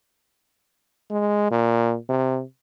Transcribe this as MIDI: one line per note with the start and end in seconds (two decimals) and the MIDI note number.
1.11 1.49 56
1.51 1.96 46
2.09 2.42 48